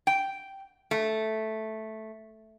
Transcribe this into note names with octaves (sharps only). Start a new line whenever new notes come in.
G5
A3